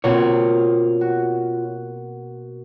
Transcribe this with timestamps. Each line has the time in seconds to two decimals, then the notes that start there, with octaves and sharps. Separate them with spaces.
0.04 B2 A#3 C4 F4 C#5
1.01 F#4